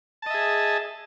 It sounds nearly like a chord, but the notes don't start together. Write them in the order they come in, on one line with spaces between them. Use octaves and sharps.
A5 D#5 E5 G#4